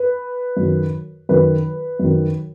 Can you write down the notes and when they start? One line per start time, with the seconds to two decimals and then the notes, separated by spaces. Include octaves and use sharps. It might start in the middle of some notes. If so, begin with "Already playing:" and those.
Already playing: B4
0.57 F#2 D#3
1.29 F#2 D#3 B4
1.99 F#2 D#3